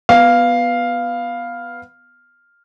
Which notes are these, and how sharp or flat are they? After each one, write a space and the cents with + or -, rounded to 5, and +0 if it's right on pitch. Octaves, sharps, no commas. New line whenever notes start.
B3 +0 F5 +0